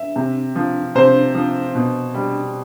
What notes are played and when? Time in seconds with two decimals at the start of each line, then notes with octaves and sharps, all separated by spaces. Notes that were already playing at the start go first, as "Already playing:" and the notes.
Already playing: E5
0.16 C3
0.56 F3
0.95 C3 C5
1.35 F3
1.75 B2
2.14 G3